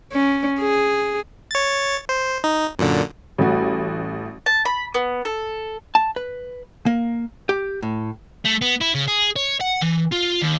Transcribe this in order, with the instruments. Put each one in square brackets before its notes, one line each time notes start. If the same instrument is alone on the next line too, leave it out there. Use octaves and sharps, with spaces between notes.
[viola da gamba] C#4
G#4
[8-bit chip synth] C#5 A6
C5
D#4
F#2 A#2 D3
[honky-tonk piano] A1 [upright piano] G3 A3 F#4
[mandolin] A5
B5
B3
A4
[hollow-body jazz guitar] A5
B4
A#3
G4
A2
[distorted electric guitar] A3
B3
E4
C#3
G#4
C#5
F#5
E3
F4
D#2